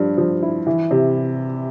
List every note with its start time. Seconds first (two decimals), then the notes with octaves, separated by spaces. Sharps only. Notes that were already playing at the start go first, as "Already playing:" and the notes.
Already playing: G2 F3
0.18 F3
0.42 E4
0.67 E3
0.91 C3